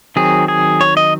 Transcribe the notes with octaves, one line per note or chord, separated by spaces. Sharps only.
D#3 F#3 C4 G#4
G#4
C#5
D#5